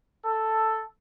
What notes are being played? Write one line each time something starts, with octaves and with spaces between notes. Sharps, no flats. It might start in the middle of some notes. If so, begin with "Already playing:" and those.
A4